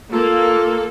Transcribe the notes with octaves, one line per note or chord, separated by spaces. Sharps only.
A#3 F4 A4